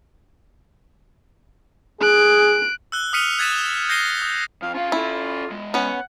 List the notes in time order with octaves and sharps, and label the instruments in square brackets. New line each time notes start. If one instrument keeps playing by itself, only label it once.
[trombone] G#4 [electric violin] F#6 D7
[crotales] E6 F#6 G7
D#6 F6 B6 C#7 D#7 F7
F#6 G#6 A6 B6 D#7 E7
G6 A#6 C7 C#7 D#7 G7
D#6
[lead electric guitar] F2 [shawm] F5
[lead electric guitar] C#4 F5 [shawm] F4
[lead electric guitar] C#4 A4 [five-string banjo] E4
[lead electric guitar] E2 G#3
[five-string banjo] B3 C#4 [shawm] F#5